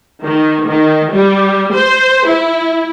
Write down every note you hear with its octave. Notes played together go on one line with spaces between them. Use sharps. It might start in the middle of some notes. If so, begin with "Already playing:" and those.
D#3
D#3
G3
C5
E4